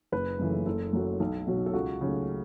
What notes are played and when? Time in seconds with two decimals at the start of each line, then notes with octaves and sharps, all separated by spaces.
0.12 F#1 B4
0.39 F#2 C#3 E3 A3
0.66 F#1 A4
0.93 F#2 F#3 A3
1.20 B1
1.47 B2 F#3
1.66 A4
1.73 C#2 F#4
2.01 C#3 F#3 A3